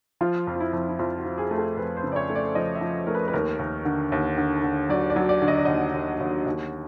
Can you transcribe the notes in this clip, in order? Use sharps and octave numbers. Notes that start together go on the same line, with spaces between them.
F3 F4
F2
F4
E4
F2
E4
F2 F4
F#4
F3
G#4
A3
A4
F2 B4
C5
C#3
D5
C#5
A3
D5
F3 D#5
E5
F3
A3 A#4
B4
B4
D#2 A#4
D#2
D3
D#2
D3
D3
F#3 D5
D5
F#3
D5
D3
D#5
D5
D#2 D#5
D#2
D#2
D#2